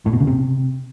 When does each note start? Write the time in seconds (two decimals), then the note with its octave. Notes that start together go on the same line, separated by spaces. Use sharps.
0.06 A2
0.13 B2
0.20 C#3
0.27 C3